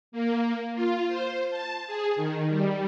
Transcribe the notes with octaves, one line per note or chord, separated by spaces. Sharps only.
A#3
F4
C5
A5
G#4
D#3
G3